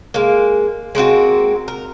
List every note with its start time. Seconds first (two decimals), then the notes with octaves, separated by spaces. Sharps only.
0.14 G#3 A#3
0.95 G#3 A#3 C4 F#4
1.68 A#4